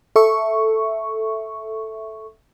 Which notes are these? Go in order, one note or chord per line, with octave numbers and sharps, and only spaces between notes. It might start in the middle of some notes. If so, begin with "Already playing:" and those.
A4 E5 C#6